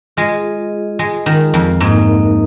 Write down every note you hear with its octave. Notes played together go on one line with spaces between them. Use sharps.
G#3 F4 G#4 D#5
G#3
D#3
F2
G#2 A#3 D#4 A#4 D#5